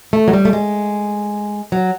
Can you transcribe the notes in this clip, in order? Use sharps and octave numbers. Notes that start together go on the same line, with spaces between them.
A3
F#3
G3
A3
G#3
F#3